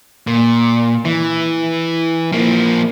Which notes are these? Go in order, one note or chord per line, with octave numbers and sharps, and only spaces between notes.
A#2
E3
F3 A#3